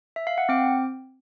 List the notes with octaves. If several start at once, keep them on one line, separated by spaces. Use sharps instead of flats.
E5
F5
F#5
C4 G5